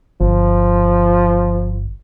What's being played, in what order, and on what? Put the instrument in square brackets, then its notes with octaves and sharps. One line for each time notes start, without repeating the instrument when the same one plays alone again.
[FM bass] G1 [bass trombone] F3